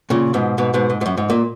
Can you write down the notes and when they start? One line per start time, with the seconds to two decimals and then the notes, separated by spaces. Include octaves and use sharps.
0.10 A#2 C#3
0.34 G#2 B2
0.58 G#2 B2
0.74 G#2 B2
0.90 G#2
1.01 G#2
1.06 F#2
1.17 G#2
1.30 A#2